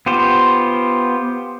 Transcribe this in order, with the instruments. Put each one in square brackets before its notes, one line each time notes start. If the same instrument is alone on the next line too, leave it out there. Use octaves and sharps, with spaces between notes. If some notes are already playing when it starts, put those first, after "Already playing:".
[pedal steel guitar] B3 F4 G4 C5